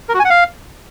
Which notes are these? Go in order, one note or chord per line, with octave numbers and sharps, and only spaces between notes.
A#4
F#4
G#5
F#5
F5